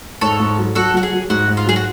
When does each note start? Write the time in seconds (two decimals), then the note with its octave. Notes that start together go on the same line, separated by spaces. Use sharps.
0.21 G#2 A4 C#5
0.40 G#2
0.58 F#3
0.75 F#3 F#4 A4
0.94 F#3 F#4
1.03 G#4
1.12 F#3
1.30 G#2 F#4
1.48 G#2
1.57 F4
1.66 F#3 G#4
1.76 F#4